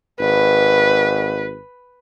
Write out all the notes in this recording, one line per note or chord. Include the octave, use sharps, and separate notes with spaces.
G#1 B4